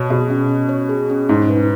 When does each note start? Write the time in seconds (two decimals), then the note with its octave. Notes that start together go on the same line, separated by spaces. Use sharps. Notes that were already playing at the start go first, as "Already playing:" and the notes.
Already playing: B2 C#5
0.10 B2 G#4
0.30 C#4
0.49 C#4
0.69 C#5
0.89 G#4
1.10 C#4
1.29 G#2 C#4
1.50 B4